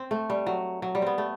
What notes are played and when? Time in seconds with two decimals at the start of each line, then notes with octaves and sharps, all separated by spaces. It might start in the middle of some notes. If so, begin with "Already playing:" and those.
Already playing: C4
0.11 A3
0.30 G3
0.47 F#3
0.82 F#3
0.95 G3
1.02 B3 C4
1.18 A3